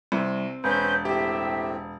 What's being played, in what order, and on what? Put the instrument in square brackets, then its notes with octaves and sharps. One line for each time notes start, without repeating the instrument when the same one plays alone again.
[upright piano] C2 [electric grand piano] C4
[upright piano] E1 [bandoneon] C#4 B4 C5 [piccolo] G6
[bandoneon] A2 C4 [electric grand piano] G4 [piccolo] E5